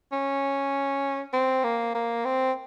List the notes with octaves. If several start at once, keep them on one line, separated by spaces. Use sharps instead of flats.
C#4
C4
A#3
A#3
C4